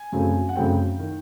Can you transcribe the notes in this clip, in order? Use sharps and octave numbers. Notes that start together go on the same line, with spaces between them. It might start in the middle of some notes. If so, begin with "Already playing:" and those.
Already playing: G#5
F#2 C#3 F#3 A3 C4
F#5
F#2 C#3 F#3 A3 C4 G5
D#3